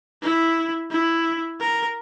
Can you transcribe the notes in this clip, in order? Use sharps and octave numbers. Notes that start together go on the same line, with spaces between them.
E4
E4
A#4